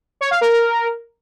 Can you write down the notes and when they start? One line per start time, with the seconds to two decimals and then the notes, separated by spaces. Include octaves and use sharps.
0.21 C#5
0.31 F5
0.41 A#4